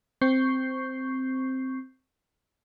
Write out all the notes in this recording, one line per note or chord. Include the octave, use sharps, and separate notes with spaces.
C4 C#6 G6 C7